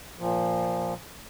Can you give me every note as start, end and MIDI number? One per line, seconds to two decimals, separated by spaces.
0.18 0.94 46
0.18 0.94 53